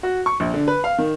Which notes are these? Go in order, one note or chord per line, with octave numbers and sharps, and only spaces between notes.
F#4
C#6
A#1
D3
B4
F5
D#3